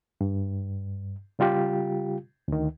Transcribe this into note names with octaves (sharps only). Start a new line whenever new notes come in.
G2
C#3 G3 F4 G4
D2 D#3